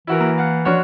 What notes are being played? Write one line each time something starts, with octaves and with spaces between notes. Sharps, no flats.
E3 E4 F#4 A#4
A#3 A#5
F5 F#5
F3 D4 F#4 C#5 F#6